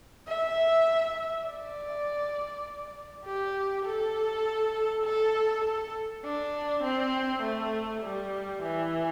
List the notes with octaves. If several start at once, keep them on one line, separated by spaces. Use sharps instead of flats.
E5
D5
G4
A4
A4
A4
D4
C4
A3
G3
E3